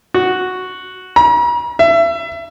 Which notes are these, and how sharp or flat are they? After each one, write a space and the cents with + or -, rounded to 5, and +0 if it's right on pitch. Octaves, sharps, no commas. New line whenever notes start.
F#4 +0
A#5 +45
E5 +30